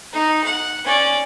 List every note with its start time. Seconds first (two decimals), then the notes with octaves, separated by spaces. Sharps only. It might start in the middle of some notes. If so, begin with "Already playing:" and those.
0.13 D#4
0.44 F#5
0.85 C#4 D5